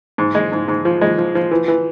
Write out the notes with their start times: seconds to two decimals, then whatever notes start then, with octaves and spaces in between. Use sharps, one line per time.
0.18 G#2
0.35 G#3
0.52 G#2
0.68 G#2
0.85 F3
1.01 G#3
1.18 F3
1.35 F3
1.51 E3
1.68 E3